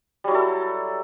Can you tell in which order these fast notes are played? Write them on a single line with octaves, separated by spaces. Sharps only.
G3 F#3 E4 A4